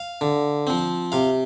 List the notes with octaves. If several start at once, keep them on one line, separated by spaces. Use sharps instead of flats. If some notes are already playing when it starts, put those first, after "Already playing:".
Already playing: F5
D3
F3 C4
C3 F5